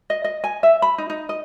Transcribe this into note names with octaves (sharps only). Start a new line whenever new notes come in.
D#5
D#5
G#5
E5
B5
D#4
D#4
D#5